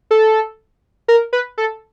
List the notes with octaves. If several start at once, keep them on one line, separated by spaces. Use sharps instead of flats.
A4
A#4
B4
A4